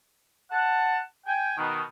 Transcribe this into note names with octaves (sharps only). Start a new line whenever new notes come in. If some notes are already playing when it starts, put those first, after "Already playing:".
F#5 A5
G5 G#5
B2 D#3